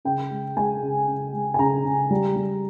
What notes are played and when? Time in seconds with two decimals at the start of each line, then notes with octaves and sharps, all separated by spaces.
0.05 C#3 G5
0.31 G#3
0.56 G#3 G#5
0.82 C#3
1.07 C#3
1.33 G#3
1.54 G#5
1.59 C#3 A#5
1.85 C#3
2.10 G3
2.36 G3